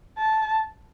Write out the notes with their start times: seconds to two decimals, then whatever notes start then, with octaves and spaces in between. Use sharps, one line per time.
0.18 A5